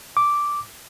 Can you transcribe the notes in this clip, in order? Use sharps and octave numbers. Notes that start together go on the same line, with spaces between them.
D6